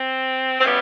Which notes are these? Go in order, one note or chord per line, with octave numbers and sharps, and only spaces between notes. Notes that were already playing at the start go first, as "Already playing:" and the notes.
Already playing: C4
C4
C#3 E3 G3 B3 C#4